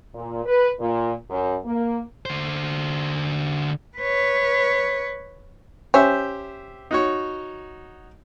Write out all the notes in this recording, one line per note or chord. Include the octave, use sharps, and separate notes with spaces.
A#2
B4
A#2
F#2
A#3
D3 C5
B4 C#5
C#4 G4 C5 E5
D#4 F#4 C#5